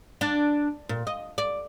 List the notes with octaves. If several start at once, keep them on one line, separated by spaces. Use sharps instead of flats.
D4
A#2
D#5
D5